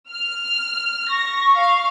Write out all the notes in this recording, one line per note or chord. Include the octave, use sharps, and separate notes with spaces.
F6
C#6 A#6
F5